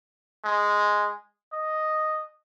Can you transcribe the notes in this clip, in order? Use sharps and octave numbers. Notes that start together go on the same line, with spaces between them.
G#3
D#5